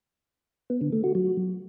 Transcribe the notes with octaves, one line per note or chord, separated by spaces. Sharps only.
B3
D3
A3
F#4
F#3